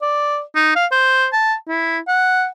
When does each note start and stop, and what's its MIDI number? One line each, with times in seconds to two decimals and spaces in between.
0.02 0.41 74
0.55 0.72 63
0.76 0.86 77
0.92 1.27 72
1.33 1.55 81
1.68 1.99 64
2.08 2.47 78